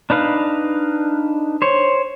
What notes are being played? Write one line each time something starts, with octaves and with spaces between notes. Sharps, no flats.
D4 D#4 B4 F5
C5 C#5